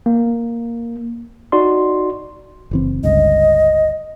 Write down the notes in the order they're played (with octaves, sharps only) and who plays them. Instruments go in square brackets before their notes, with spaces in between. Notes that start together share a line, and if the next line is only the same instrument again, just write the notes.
[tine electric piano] A#3
D#4 F#4 D5 C6
[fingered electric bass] F#1 E3 C4
[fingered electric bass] G1 C#2 G2 [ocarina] D#5